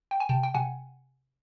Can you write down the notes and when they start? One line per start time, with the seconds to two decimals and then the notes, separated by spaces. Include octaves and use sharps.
0.11 G5
0.20 G#5
0.29 C3 G5 A5
0.43 G5
0.54 C3 F#5 G#5